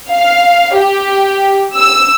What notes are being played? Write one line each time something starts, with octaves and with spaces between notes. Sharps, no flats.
F5
G4
E6